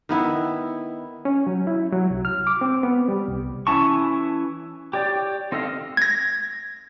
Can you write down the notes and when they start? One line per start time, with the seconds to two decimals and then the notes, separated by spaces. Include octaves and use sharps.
0.09 D#3 B3 E4
1.25 C#4
1.47 F#3
1.67 E4
1.93 F#3
2.10 C2
2.25 F6
2.47 D6
2.61 C4
2.83 B3
3.08 G3
3.28 C2
3.67 E3 C#4 E4 A5 C#6
4.93 G4 C#5 D5
5.52 C4 D#4 A4 D#5 F5
5.97 G#6 A#6